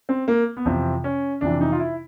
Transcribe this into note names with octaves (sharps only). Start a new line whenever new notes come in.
C4
A#3
B3
F2 C3 E3 C4
C#4
F2 C3 E3 D4
D#4
F4
E4